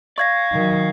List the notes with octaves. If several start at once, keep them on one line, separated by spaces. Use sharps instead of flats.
D5 F5 C#6 G#6 A#6
D#3 F#3